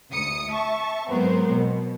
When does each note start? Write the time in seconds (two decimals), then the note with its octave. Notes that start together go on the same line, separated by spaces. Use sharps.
0.13 D2 D#6 C#7
0.51 E5 A5 C#6
1.08 G#2 F#3 B3 C4 A#4 C5
1.50 B2